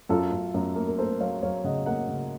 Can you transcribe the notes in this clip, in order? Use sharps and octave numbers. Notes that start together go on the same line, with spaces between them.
F#2 F4 A4
F#2
F#2
A#3
A#4
A#3 A4 C5
F#3 C#5 F5
F#3 C#5 F5
C#3 D#5 F#5
A#3 D#5 F#5
C#3